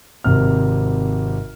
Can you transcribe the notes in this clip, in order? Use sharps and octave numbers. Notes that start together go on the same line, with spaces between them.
G#1 C3 F6